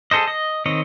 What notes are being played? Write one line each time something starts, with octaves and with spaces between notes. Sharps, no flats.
G#4 A4 C5 D#5
D#5
D#3 C4 C#5 D#5